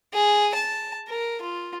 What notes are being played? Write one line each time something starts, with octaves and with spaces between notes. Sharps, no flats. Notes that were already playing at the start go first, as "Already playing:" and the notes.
G#4
A5
A#4
F4